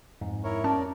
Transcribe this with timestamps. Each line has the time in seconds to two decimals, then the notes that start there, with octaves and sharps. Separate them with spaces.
0.21 F2 G#2
0.44 E4 A#4 C#5
0.64 C#4 A#4 D5 A5